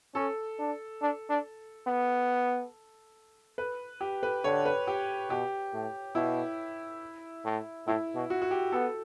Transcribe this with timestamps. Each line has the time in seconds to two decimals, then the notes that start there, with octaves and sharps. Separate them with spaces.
0.15 C#4 A4
0.58 D4
1.01 D4
1.29 D4
1.87 B3
3.58 B4
4.01 G4
4.23 B4
4.44 D3 C#5
4.65 B4
4.87 G4
5.30 B2 G4
5.73 A2
6.15 B2 E4
7.45 A2
7.87 A2 E4
8.15 B2
8.30 F#4
8.42 F#4
8.51 G4
8.72 B3 A4